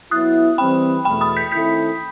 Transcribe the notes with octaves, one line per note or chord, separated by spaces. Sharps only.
F#3 B3 E4 D#6 F#6
E3 G3 C4 G5 B5
E2 B2 A3 G5 B5
B5 D#6
G6 B6
D#3 A3 C4 E4 A4 G6 B6